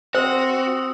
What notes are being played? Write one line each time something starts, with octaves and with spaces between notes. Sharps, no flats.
C4 F#4 C5 D#6 E6